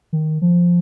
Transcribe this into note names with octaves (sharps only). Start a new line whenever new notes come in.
D#3
F3